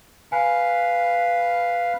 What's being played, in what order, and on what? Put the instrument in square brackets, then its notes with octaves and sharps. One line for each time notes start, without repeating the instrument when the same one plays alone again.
[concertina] B4 F5 [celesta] G#5